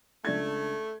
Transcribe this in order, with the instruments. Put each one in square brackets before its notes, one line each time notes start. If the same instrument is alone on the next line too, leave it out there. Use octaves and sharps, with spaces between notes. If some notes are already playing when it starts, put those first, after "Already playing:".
[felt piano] C#2 D4 G#6 [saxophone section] A3